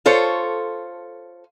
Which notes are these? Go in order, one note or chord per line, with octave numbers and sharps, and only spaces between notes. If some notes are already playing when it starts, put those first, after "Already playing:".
F4 A4 C5 C#5